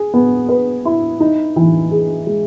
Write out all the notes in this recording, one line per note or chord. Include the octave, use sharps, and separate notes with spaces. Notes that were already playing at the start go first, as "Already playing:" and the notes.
Already playing: G#4
B3
B4
E4
D#4
E3
G#4
G#3